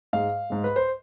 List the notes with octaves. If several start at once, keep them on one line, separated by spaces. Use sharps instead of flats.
G#2 G#3 F5
G#2 G#3
B4
C5